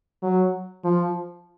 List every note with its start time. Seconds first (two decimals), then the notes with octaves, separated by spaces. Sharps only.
0.23 F#3
0.84 F3